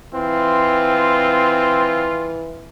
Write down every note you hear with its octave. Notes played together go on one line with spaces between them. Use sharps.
E3 C4 F4